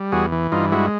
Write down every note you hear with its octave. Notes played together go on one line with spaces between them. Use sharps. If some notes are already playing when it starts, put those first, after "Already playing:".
Already playing: G3
E2 F#4 G#4
E3
G2 D#4 F4
G#3 E4 F#4